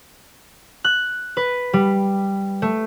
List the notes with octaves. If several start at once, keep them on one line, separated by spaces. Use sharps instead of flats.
F#6
B4
G3
A3